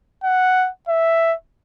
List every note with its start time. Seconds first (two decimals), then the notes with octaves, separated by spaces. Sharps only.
0.24 F#5
0.88 E5